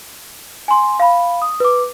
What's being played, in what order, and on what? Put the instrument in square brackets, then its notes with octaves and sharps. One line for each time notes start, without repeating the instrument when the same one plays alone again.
[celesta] G#5 C6
F5 B5
D#6
B4 D6